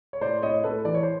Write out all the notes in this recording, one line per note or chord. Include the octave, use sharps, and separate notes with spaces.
C#5
A2 C5 D5
A2 C#5 D#5
A2 A4 B4
E3 D5
C#5
C5